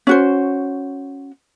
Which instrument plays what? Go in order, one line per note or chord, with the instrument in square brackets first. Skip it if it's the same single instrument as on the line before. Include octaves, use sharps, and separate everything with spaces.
[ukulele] C#4 F#4 C5